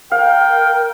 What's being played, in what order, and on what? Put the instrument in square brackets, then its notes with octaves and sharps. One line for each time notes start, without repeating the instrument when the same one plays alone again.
[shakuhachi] A#4 [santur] F5 [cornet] G5